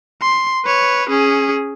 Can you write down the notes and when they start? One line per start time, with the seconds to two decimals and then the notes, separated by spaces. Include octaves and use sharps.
0.22 C6
0.65 B4 C#5
1.10 C#4 G#4